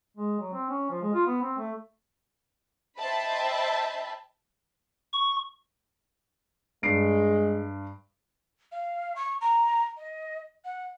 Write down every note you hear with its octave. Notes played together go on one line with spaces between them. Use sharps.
G#3
F#3
C4
C#4
F3
G#3
F4
B3
C4
A3
C5 D#5 E5 G5 A5 B5
C#6
G2 G#3 C7 D7
F5
C#6
A#5
D#5
F#5